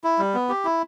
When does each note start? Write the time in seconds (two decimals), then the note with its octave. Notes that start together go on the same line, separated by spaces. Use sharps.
0.04 E4
0.19 G3
0.34 B3
0.49 G4
0.65 E4